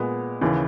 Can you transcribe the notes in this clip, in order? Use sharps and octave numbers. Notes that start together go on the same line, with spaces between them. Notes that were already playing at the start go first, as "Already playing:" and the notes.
Already playing: A#2 G#3 B3
D#2 C#3 E3